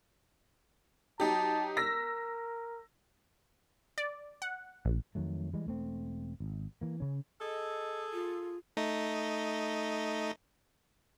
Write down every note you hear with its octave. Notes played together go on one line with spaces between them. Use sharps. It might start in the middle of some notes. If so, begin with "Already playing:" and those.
F#3 D#4 G4 A5
A#4 E6 A#6 B6
D5
F#5
A#1
F2 D#3 F#3 A3
E3 G3 G#3
E1 A3 C4
G#1
E3 A#3
C#3 C#4
G#4 A4 D#5
F4
A3 D#4 D#5